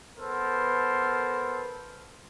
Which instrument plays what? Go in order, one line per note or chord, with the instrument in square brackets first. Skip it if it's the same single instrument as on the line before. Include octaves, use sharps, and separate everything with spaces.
[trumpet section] B3 A4 A#4 C5